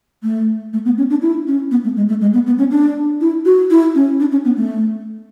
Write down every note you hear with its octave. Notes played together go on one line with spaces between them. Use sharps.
A3
A3
B3
C#4
D4
E4
C#4
B3
A3
G#3
A3
G#3
B3
B3
C#4
D4
E4
F#4
E4
C#4
D4
C#4
B3
A3